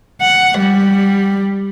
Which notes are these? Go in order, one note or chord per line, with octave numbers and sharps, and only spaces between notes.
F#5
G3